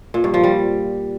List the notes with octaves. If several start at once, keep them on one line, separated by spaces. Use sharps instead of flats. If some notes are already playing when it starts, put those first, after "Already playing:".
A#2
G2
F3
G3